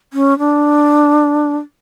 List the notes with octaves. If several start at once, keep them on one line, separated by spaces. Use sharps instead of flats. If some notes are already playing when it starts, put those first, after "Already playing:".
C#4
D4